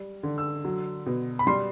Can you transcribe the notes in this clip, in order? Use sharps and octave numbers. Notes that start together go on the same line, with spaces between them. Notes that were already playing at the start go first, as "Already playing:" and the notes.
Already playing: G3
D3
E6
F#3
B2
B5
G3 C6